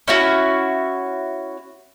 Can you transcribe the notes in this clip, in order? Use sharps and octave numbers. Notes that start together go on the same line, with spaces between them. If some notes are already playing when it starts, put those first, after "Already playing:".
C#4 E4 F#4